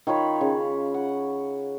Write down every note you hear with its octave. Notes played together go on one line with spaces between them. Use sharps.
D#3 F4 C#5 B5
C#3
F#5